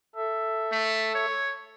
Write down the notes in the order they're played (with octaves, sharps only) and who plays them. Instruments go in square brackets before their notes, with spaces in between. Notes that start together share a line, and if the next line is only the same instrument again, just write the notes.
[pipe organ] A4 E5
[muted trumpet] A3
C#5